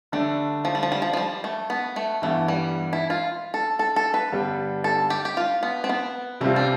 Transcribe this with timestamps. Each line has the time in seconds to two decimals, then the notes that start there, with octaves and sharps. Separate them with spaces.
0.12 D3 G3 A3 D4
0.65 F3
0.75 G3
0.83 F3
0.92 G3
1.02 F3
1.13 F3
1.17 G3
1.44 A3
1.70 B3
1.96 A3
2.22 G2 E3 A3 B3
2.48 G3
2.93 E4
3.10 F4
3.54 A4
3.79 A4
3.96 A4
4.14 B4
4.32 G2 D3 G3 B3 D4
4.84 A4
5.10 G4
5.25 G4
5.37 F4
5.63 B3
5.84 C4
5.89 B3
6.41 C3 G3 A3 C4 F4
6.56 D4